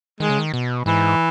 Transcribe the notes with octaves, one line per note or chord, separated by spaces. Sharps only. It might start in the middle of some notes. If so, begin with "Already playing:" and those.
D#3 G#3
C#3
D#3
B2
G#2 E3